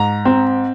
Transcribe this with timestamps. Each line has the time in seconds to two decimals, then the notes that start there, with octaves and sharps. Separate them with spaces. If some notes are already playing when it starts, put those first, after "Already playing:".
Already playing: G#2 A#5
0.25 C4